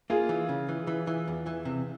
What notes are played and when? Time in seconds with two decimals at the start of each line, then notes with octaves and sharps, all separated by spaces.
0.10 A#3 F4 G#4
0.29 E3
0.49 C#3
0.69 E3
0.87 E3
1.07 E3
1.28 E2
1.46 E3
1.65 C3